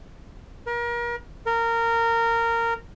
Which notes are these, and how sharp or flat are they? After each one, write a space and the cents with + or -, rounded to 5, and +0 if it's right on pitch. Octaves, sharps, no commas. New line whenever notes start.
A#4 +35
A#4 -15